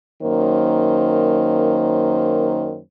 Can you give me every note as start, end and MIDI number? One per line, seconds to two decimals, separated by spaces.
0.22 2.79 42
0.22 2.79 51
0.22 2.79 58
0.22 2.79 72